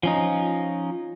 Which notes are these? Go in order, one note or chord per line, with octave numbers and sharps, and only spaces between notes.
F3 C#4 D#4